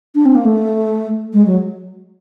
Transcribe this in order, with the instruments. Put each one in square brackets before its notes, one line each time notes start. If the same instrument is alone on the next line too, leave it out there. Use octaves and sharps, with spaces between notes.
[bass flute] D4
C4
A#3
A3
G#3
F#3